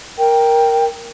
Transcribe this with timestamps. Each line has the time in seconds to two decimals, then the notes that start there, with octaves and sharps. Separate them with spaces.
0.18 A#4 G5